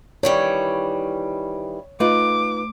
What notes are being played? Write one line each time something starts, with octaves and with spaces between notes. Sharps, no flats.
D#3 E3 G3 C#5
A3 D#4 F4 B4 D6